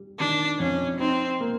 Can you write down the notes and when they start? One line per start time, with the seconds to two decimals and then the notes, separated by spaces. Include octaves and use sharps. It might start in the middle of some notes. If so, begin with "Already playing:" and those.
Already playing: G3
0.19 D#3 D4
0.59 F2 C#4
0.99 C4 D#4
1.41 A#3